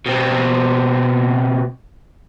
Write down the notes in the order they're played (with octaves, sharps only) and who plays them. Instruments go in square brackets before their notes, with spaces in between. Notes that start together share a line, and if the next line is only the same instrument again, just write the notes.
[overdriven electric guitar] B2 C4